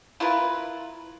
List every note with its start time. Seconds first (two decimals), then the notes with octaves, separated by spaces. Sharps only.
0.20 E4 F4 A#4 B4